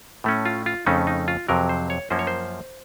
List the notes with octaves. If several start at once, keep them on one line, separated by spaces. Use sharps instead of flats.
A2 A3 C#4
F4
F4
F2 C#3 A3 C#4 D#4
D#4
F4
F2 C3 F#3 A#4
C5
C#5
F#2 F3 A#3 C#4 C5
C#5
C5